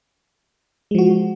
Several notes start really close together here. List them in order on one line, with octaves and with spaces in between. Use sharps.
G#3 F3 F#4